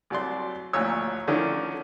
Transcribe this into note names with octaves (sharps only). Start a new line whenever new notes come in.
C2 F#3 D5 C6
A1 D2 A#2 F3 C#5 E6
D3 D#3 F3 C#4 D4 E4